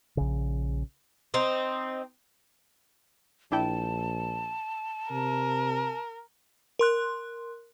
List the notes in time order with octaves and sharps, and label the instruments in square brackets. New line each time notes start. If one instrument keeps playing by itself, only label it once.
[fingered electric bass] A#1 C#3
[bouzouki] C4 D#4
[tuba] A#1 [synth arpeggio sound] D4 E4 G5 [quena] A5
[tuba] C3 [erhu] A#4
[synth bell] A#4 C6 F#6